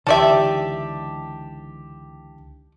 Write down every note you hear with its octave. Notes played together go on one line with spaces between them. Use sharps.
C#2 D3 E3 D#4 G4 D5 E5 A5